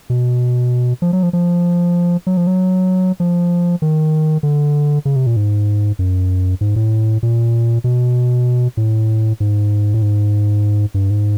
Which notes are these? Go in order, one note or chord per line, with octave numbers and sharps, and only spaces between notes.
B2
F3
F#3
F3
F3
F#3
F3
F#3
F3
D#3
D3
C#3
C3
A#2
G#2
F#2
G#2
A2
A#2
B2
A2
G#2
A2
G#2
G2
G#2